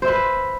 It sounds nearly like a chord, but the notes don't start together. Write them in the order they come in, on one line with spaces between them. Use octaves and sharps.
C5 E5 B4